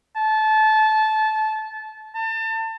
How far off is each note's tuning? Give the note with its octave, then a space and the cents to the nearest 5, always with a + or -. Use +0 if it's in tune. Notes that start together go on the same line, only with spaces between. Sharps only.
A5 -20
A5 +30